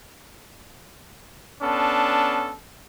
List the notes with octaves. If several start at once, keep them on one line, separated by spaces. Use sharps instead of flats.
B3 C#4 D4 A4